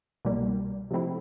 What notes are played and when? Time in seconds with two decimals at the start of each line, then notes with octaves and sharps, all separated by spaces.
0.25 C2 B2 G3 A#3
0.91 C3 F3 A3 C4 E4